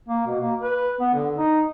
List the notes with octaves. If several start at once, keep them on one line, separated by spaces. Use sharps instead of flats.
A#3
B2
A#3
B4
B3
D3
D#4